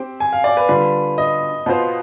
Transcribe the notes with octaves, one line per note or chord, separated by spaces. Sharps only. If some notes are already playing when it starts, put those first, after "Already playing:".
Already playing: C4 G4 C5 G5
G#5
F5
D5
B4
D3 G3 D4 F4 B4
D#5
B2 B3 F4 C5